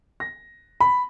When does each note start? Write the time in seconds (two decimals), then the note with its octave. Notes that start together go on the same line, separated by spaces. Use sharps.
0.20 A#6
0.80 B5